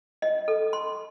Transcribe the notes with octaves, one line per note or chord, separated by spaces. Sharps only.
D#5
A4
C6